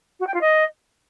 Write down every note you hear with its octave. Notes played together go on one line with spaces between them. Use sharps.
F#4
G5
F4
D#5